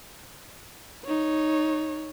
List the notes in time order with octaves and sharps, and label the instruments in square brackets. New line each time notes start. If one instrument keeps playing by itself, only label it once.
[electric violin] D#4 C#5